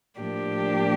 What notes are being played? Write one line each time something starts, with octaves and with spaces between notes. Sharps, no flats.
A2 F3 A#3 D4 G4